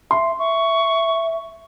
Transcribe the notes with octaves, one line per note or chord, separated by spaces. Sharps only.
E5 C6
E5 C#6